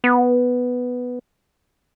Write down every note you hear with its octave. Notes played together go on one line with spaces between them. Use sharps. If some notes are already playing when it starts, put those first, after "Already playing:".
B3